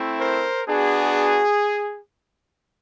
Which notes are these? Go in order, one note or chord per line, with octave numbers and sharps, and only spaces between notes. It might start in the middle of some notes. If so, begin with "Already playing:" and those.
Already playing: A3 C4 E4
A#4 C5
B3 D4 F#4 G#4